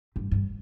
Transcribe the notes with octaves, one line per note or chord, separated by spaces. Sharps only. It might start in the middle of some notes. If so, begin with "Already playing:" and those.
G2
G2